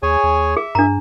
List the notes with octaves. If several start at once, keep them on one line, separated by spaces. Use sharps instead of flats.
D#2 G#4 C#5 G#5
D#2
G#4 E5
G2 D4 A#5